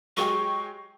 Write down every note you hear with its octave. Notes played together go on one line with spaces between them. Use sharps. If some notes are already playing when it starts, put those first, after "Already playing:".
F#3 G#3 G4 C#6